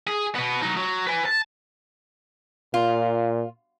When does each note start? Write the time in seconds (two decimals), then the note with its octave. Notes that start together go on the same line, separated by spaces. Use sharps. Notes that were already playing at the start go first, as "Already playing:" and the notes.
0.07 G#4
0.35 B2 B3
0.62 F#3 D#4
0.77 F#3
1.07 B4 G#5
1.25 A5
2.74 A#2 F4